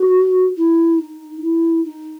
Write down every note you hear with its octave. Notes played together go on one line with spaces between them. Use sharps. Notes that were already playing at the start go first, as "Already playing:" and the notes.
Already playing: F#4
E4
D#4
E4
D#4